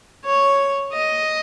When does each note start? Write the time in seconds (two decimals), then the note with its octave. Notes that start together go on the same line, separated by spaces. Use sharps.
0.24 C#5
0.92 D#5